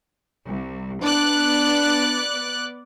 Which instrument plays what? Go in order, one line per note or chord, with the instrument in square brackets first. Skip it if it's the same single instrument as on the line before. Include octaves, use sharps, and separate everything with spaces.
[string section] C2
[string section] B3 D5 F#6 [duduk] D4